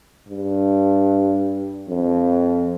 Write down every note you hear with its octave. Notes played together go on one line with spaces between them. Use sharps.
G2
F2